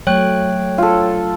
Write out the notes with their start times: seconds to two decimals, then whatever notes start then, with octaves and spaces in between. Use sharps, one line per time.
0.07 F#3 A3 C#5 G5 F#6
0.78 F4 A4